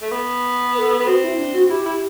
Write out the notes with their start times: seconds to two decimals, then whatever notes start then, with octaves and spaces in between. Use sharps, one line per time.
0.02 A3
0.11 B3
0.74 B4
0.78 A4
1.00 B3
1.06 C4 F#4
1.23 E4
1.37 D4
1.53 F#4
1.69 E4 G4
1.85 E4